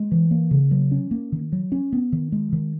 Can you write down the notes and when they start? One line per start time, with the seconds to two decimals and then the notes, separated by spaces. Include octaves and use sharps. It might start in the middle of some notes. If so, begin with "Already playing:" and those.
Already playing: G#3
0.12 E3
0.31 A#3
0.51 C#3
0.71 F#3
0.91 C#4
1.11 A#3
1.32 D#3
1.52 F#3
1.72 C#4
1.92 B3
2.12 D#3
2.32 G#3
2.52 D#3